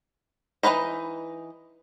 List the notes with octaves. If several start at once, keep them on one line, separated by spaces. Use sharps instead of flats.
E3 C4 D#4 B4 D#5